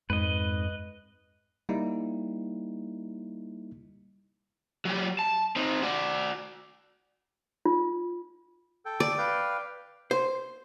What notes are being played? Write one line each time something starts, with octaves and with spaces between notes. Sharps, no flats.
F2 G#2 B4 D#5
G3 A#3 D#4 E4
F#3 G4
A5
C4 D#4
F#4 D5
F4
A4 G5
D5
B4 F5 G5
C5